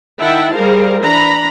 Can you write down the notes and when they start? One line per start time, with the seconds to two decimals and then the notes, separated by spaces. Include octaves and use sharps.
0.20 D#3 E4 E5 F#5 G5 A5
0.53 G3 G#4 A#4 C5 F5
1.02 E3 D4 A#5 B5